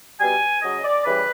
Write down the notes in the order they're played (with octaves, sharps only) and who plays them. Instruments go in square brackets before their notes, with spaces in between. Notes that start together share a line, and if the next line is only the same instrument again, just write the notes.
[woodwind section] B2 G3 G#5
C#3 F#3 D#5
D5
C#3 E3 G3 B4